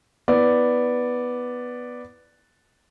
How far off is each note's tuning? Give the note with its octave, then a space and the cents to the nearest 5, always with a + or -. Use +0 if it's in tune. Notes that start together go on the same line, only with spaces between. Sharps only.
B3 +0 E4 -20 D5 +0